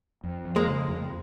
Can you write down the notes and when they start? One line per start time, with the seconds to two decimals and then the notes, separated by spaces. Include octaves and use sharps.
0.24 F2
0.45 F3
0.56 G#3 A#3
0.67 C#3
0.88 F2